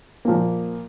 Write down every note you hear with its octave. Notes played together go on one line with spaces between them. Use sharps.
A#2 F3 A#3